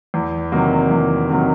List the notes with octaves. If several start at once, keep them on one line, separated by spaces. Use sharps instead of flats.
E2
C3 D#3 F#3 A#3
E2
C3 D#3 F#3 A#3